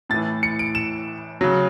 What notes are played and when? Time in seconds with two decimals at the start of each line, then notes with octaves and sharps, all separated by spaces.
0.09 A2 A6
0.14 E3
0.43 C#7
0.59 D7
0.75 E7
1.41 C#3 F#3